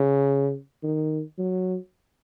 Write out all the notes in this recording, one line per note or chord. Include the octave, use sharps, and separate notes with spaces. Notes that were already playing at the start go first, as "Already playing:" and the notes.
Already playing: C#3
D#3
F#3